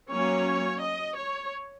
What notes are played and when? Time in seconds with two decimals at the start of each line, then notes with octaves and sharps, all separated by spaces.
0.11 F#3 A#3 C#4 C#5
0.82 D#5
1.17 C#5